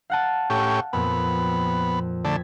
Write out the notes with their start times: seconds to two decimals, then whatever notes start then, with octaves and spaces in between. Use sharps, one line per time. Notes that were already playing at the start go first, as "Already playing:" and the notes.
0.10 F5 F#5 A5
0.50 A2 C#4 G4
0.93 F2 A#2 B3
2.25 D3 A3 G#6 A6 B6